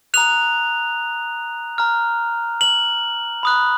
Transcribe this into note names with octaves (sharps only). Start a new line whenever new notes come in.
A#5 D#6 F#6 F7
A#5 F6
F#7
B5 D#6 F#6